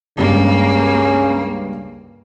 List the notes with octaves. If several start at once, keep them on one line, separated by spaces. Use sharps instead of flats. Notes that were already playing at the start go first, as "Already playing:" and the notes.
C#2 G2 C#3 A#3